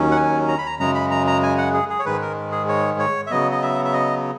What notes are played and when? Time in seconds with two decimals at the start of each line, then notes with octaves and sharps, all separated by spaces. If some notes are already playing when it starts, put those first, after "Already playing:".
Already playing: D#2 D#3 F#3 C#4
0.11 F#5
0.17 G#5
0.48 A#5
0.58 B5
0.66 A#5
0.79 F#2 C#3 G#3 A#5
0.95 B5
1.11 A#5
1.27 A#5
1.43 G#5
1.58 F#5
1.73 G#4
1.90 G#4
1.99 C#5
2.05 G#2 D#3 G#3 B4
2.21 A#4
2.52 G#4
2.68 C#5
2.99 C#5
3.27 E5
3.31 C#3 F#3 B3 D#5
3.51 D#5
3.62 E5
3.85 E5
3.93 D#5